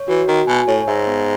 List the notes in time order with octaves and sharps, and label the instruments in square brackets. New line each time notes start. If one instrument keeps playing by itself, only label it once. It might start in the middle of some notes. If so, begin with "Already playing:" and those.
Already playing: [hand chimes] C#5
[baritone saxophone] E3 [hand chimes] F#4
[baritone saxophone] D#3 [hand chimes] F#4
[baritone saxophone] B2 [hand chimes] G#5
[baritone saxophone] A2 [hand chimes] C#5
[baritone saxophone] G#2 [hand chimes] E5
[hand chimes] B3